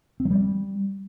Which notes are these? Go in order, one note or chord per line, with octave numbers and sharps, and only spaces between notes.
C4
F#3
G3